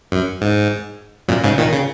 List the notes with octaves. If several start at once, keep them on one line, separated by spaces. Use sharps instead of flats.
F#2
G#2
F#2 A#2
G#2 C#3
A#2 D#3
C#3